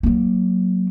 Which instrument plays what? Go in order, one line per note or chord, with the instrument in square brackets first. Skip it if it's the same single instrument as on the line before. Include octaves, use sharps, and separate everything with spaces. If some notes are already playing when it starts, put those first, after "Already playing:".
[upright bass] F#3 A#3